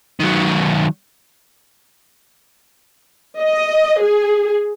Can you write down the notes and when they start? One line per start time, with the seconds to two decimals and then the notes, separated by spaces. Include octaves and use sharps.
0.20 D#3 F#3
3.40 D#5
4.02 G#4